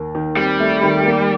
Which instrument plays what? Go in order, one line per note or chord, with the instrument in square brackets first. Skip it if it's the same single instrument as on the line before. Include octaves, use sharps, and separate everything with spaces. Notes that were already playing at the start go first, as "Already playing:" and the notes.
Already playing: [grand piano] D#2 A#3
D#3
[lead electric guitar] G3 [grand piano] C4
[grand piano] A3
D#3
A#3